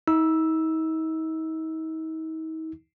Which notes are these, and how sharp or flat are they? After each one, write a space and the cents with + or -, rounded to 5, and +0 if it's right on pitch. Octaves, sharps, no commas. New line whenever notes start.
D#4 +40 E6 +0